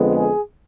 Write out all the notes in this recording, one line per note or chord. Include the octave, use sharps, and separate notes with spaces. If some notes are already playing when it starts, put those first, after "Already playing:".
Already playing: F2 D3 G#3 B3
G#4